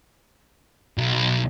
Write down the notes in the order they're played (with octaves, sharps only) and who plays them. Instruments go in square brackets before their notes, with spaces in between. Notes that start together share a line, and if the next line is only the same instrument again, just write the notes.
[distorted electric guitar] B1